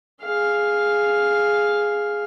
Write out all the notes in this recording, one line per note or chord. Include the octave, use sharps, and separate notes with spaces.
G#4 F5